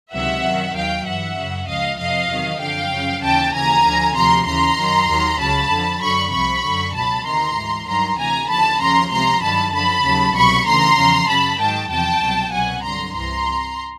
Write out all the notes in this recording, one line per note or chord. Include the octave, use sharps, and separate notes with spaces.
C#2 C3 D#3 F#3 E5 F#5
F#2 D#3 F#3
D#2 D#3 F#3 F5 G5
G2 E3 E5 F#5
F#2 C#3 F#3
C#2 C#3 F3 D#5 F5
F2 C3 F3 D#5 F5
E2 C3 D#3 F#3
F#2 D3 F3 F5 G5
F#2 C#3 F3
D#2 C#3 E3 G5 A5
D#2 C#3 E3 G#5 A#5
D2 D3 F3
D2 C3 F3 A#5 C6
D#2 C#3 E3 A#5 C6
F#2 D#3 F#3
D#2 D#3 F#3
C#2 C#3 F#3 A5 B5
F2 D3 F3
F#2 D3 F#3 B5 C#6
C2 C3 F3 B5 C#6
F#2 D3 F#3
C#2 B2 F#3 A5 B5
D2 C3 D#3 A#5 C6
G#2 E3
G2 D#3 F#3 A#5 C6
D2 C3 E3 G#5 A#5
D#2 D3 F3 A5 B5
D#2 C#3 F3 A#5 C6
C#2 C3 F3 A#5 C6
G2 D#3 F#3 A5 B5
F#2 D3 F3 A5 B5
D#2 C#3 F#3
C2 B2 F#3 B5 C#6
D2 C#3 E3 A#5 C6
E2 C#3 F3
F#2 C#3 F#3 A5 B5
G#2 D#3 F#3 G5 A5
E2 C3 F3 G5 A5
C2 B2 F#3
C2 B2 F#3 F#5 G#5
G2 D3 F#3 A#5 C6
C2 C3 E3 A#5 C6